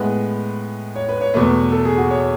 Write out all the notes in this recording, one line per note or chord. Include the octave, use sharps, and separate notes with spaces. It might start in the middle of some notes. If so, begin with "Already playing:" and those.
Already playing: A2 G#3 B3 B4
C#5
B4
C#5
E2 B2 A3 B4
A4
G#4
F#4
C#5